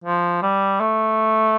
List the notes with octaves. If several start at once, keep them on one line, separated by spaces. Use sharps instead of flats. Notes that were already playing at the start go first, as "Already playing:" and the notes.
F3
G3
A3